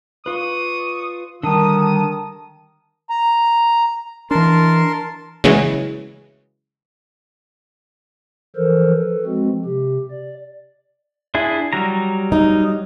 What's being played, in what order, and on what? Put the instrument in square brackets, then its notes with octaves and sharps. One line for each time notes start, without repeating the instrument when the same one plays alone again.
[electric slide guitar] F4 B4 [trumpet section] D5 C#6 D#6
[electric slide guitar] D3 G3 [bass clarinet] D#3 [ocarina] A5 [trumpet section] D#6
[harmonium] A#5
[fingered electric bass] E3 D4 [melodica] A#4 A5 C6
[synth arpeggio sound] C#3 E3 F#3 G#3
[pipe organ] E3 F3 A4 A#4 C5
A4 B4
F3 G#3 C4 F#4
C3 G4
D5
[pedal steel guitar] D4 E4 G#4
F#3 G3 A#5
[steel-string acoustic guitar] D#4